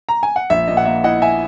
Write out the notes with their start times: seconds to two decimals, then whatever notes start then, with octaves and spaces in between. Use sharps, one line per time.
0.09 A#5
0.23 G#5
0.36 F#5
0.50 A#1 E5
0.68 A#2 D#5
0.77 F#5
0.85 A#3 E5
1.04 E4 D#5 F#5
1.22 E5 G#5